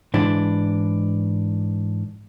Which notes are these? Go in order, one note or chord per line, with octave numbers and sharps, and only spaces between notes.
G#2 E3 D4